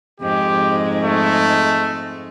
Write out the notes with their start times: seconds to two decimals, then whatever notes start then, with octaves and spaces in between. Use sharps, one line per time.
0.20 F2 G#2 G#3 G4
1.03 A3